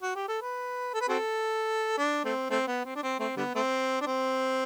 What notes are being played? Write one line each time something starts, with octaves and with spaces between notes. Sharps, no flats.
F#4
G4
A4
B4
A4
B4
C4 F#4 A4
D4
A3 C4
A3 C4
B3
C4
D4
C4
A3 C4
D3 G3 B3
A3 C4
D4
C4